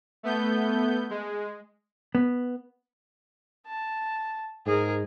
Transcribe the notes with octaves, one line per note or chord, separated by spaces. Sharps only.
A3 B3 G6
G#3
B3
A5
G#2 G#4 A#4